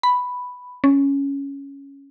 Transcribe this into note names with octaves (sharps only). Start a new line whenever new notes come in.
B5
C#4